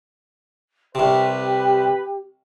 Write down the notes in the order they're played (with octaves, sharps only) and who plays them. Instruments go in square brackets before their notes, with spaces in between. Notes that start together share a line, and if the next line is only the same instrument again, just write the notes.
[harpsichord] C2 C3 [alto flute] G4 [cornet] B4